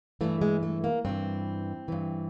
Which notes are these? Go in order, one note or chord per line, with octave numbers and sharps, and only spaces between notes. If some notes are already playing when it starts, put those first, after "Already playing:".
G2 E3 A3
G#3
A3
A#3
G2 E3 C4
G2 E3